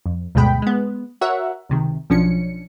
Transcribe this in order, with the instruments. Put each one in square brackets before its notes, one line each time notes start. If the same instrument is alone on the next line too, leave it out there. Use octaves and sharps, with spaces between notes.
[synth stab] F2
D2 G2 B2 G#3 G5 B5
G#3 B3
F#4 A#4 C#5 E5 F#5
C#2 C3 D#3
B1 F3 C#4 D4 C#7